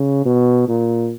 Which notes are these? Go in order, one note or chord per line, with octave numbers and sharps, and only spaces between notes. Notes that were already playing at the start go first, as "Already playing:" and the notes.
Already playing: C#3
B2
A#2